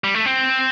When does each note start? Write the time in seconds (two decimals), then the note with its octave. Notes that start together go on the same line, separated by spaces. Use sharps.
0.04 G3
0.14 A3
0.26 C4